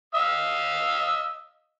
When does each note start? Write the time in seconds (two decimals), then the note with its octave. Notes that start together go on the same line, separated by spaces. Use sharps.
0.15 D#5 F5 E6